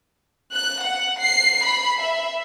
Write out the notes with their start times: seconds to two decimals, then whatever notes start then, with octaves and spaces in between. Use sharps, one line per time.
0.53 F#6
0.83 F#5
1.20 C7
1.66 B5
2.01 E5